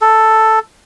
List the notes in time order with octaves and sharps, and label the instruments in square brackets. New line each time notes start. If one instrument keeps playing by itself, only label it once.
[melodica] A4